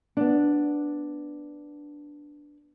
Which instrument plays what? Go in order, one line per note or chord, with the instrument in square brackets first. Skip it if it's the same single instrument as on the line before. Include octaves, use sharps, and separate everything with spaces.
[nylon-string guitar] B3 D4